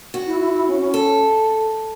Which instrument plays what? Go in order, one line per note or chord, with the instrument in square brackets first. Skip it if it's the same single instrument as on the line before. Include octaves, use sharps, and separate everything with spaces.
[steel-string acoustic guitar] F#4
[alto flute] E4
E4
E4
C#4
C#4
[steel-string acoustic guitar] A4